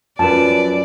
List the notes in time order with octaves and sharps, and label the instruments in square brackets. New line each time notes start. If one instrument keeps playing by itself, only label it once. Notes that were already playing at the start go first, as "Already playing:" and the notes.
[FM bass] F#2 [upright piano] F3 B4 [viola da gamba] D5 [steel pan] A5